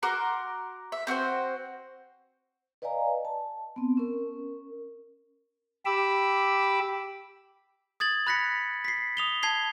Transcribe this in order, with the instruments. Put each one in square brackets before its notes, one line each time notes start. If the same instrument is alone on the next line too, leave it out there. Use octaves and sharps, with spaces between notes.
[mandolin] F#4 A#4 C6 D6
E5
C4 F#4 A#4 C5
[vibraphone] B4 D5 D#5 F5 G#5 A#5
A5
B3 C4
C#4 A#4
[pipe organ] G4 B5 D6 E6
[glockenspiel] D#6 G#6 A6 F#7
B5 F#6 A#6 B6 C#7
B6 C7
D#6 F7 G7
A5 G#6 C7 G7